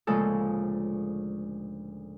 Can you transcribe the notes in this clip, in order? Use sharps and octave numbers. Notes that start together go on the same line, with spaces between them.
D2 A#2 C#3 F3 G#3 A4